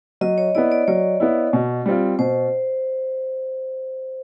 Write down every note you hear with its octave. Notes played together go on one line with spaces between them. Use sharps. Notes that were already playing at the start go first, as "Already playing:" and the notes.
F#3 D#5
C#5
B3 E4 D5
D5
F#3 C#5
B3 E4
B2
G3 C4 F4
B2 C5